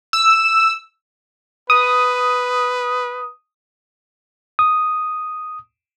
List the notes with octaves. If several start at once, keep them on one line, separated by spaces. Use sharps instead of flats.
E6
B4 D#6
D#6